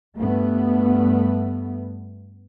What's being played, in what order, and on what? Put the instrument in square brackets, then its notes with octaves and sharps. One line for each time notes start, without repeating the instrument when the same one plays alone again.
[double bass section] G2 A3 B3